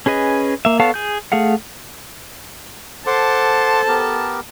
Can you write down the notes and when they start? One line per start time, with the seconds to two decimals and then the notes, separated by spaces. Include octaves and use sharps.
0.06 C#4 G#4 B4 D#5
0.65 A#3 E5
0.80 B3 A4 C#5 F5 A5
0.94 G#4 G6
1.32 A3 G#4 F5 F#5
3.07 A4 C5 F#5 A5 C6 D6
3.88 B3 G4 A#4